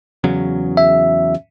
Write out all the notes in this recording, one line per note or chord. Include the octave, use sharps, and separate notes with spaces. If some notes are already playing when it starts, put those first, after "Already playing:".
E2 C#3 F#3
E5